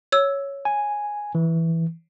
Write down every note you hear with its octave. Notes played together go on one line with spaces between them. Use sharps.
C#5 E6
G#5
E3